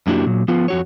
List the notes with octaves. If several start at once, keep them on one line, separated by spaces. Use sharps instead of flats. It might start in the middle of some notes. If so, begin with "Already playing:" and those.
F#2 A#3 D4 E4 F#4 G4
A#2 F#3
F3 B3 F4
F2 F#4 C#5